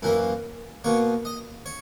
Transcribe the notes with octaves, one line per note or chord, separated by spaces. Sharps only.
F#2 E3 A#3 E4
B2 A#3 C#5
D#5
C#5